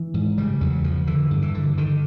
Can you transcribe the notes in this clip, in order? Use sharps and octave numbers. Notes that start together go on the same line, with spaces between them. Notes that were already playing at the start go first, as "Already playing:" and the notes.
Already playing: E3
G#2
C#3 G3
E2 F#3
C#3 F3
D3 E3
G2
E3
D3
D3 D#3